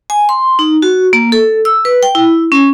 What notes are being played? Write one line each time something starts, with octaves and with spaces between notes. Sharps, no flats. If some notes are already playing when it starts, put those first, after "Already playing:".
G#5
C6
D#4
F#4
A#3
A4
E6
B4
G5
E4
C#4